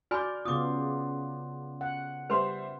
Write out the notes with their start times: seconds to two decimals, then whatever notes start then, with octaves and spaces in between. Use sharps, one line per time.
0.11 F#4 D5 G#5 B5 F6 G6
0.45 C#3 B3 F4 D6 D#6
1.81 F#5
2.30 G3 B4 C5 E5 C6